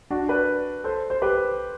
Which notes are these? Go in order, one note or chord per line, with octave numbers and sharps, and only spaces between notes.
D4 F#4
B4 D5
A4 C5
C5
G4 B4